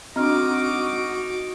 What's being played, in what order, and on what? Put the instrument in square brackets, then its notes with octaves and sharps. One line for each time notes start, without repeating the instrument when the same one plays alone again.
[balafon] C4 D4 [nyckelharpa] D#4 D6 [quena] F#4 [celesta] D#5 F6